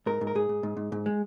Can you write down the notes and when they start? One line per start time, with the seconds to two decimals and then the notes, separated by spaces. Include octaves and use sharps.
0.06 G#2 A#4
0.21 G#2
0.27 A#4
0.35 G#2 G#4
0.49 G#2
0.63 G#2
0.77 G#2
0.92 G#2
1.06 G#3